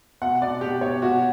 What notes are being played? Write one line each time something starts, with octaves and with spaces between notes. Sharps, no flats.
B2 F#5
B2 D5
B2 G4
B2 C#5
B2 F#4